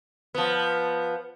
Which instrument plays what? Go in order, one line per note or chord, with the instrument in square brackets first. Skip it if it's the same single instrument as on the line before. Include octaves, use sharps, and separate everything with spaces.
[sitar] F3 B3